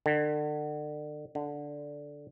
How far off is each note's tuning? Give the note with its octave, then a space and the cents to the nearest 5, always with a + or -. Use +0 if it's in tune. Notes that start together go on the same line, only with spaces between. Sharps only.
D3 +35
D3 -5